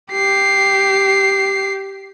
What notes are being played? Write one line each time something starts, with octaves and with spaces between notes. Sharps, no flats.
G4 C7